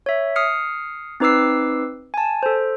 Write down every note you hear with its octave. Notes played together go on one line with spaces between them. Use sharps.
C#5 E5
D#6 F6 C7 C#7
C4 D#4 B4 D6 E6 C7
G#5 A5
A4 C5